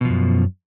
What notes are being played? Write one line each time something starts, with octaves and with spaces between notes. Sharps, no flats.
F#2 B2 F3